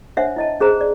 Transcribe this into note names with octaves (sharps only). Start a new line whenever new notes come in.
D4 C5 C#5 E5 F#5
E4 D#5 A5
C#4 G#4 C5 A#5
D5